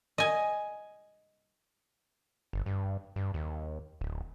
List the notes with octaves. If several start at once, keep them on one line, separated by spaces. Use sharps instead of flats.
D#5 G#5
G1
G2
G2
D#2
D1